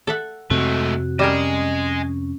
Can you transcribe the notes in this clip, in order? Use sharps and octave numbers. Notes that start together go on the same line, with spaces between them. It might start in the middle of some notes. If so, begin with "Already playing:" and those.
A4 E5 F#5
F2 G#2 C3 A3 C4 F#4
G3 C#4 A#4 D#5 G#5